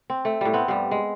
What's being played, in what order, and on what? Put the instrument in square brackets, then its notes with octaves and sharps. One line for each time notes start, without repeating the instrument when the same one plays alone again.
[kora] C4
A3
A2 G3
B3 C4
G2 G3
G#3